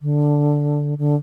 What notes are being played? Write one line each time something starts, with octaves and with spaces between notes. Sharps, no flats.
D3
D3